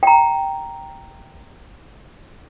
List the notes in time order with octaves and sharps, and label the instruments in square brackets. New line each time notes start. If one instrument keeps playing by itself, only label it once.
[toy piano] G5 A#5